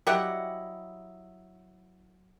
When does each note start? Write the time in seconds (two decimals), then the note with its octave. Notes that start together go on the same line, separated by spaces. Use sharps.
0.07 F#3 G3 E4 G4 D#5 F#5